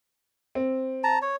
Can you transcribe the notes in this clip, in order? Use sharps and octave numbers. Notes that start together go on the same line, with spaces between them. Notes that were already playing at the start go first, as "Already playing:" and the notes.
C4
A5 A#5
C#5